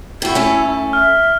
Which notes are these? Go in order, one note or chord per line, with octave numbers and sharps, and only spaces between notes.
C3 E4 F#4
A3 C#4
E5 F6